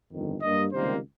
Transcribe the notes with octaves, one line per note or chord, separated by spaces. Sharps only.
G1 F2 D#3
G2 G3 A#3 D#5
C#2 C3 D#3 G3 A#3 C5